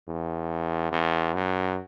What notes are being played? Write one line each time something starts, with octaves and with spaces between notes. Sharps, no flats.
E2
E2
F#2